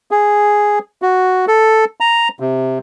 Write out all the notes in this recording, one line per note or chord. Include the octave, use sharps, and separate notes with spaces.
G#4
F#4
A4
A#5
C3